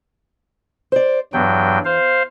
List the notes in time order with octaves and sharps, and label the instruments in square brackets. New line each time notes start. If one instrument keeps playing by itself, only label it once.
[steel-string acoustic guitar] C5 D5
[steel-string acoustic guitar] E2 [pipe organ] G2 F#3 G5
[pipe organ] C5 F5